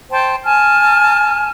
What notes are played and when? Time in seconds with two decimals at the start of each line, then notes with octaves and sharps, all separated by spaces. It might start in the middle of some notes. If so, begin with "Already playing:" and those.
0.11 C5 G5 A5
0.45 G#5 A5 F6